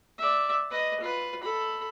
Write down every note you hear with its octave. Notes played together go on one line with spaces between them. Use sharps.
D5 E5
B4 D#5
F4 B4
A4 B5